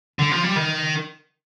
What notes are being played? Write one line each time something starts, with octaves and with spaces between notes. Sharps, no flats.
D3
F3
G3
D#3